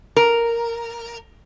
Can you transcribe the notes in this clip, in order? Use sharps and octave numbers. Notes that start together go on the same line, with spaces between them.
A#4